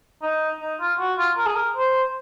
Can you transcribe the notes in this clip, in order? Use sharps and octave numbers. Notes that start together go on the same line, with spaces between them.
D#4
D#4
F4
F#4
F4
A#4
G#4
A#4
C5